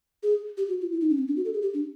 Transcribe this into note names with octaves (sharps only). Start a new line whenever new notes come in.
G#4
G4
F#4
F4
E4
D#4
C#4
C4
D4
F#4
A4
G#4
G4
D4